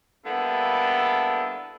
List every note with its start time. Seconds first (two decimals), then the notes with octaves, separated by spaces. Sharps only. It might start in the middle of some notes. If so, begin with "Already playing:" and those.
0.25 D3 G3 A#3 B3 E4 A4